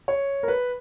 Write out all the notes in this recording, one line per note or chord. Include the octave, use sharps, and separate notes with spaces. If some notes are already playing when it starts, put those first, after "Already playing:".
C#5
A#4
B4